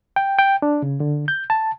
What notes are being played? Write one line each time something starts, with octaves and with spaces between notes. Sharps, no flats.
G5
G5
D4
C#3
D3
G6
A5